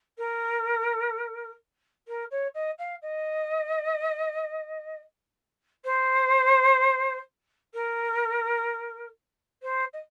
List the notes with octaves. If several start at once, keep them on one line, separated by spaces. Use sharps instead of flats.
A#4
A#4
C#5
D#5
F5
D#5
C5
A#4
C5
D#5